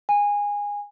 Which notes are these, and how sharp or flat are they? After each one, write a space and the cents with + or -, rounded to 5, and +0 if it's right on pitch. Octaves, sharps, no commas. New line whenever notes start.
G#5 -20